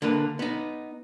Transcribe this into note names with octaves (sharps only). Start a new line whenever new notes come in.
D3 A#3 B4
B3 D#4